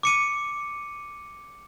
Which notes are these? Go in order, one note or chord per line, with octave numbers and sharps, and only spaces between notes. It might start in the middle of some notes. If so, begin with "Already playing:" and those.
D6 C#7 D#7